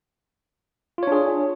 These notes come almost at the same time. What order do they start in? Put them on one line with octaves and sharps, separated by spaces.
F4 C#5 D4 G#4